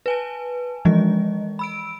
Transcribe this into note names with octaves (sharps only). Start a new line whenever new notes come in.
B4 G#5 A5
E3 F3 G#3 D#5
B5 E6 D7